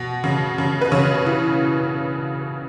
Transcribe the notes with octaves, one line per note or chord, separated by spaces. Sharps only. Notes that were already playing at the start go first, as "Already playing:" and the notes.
Already playing: B2
C#3
C#3
B4
C#3 C#5
E3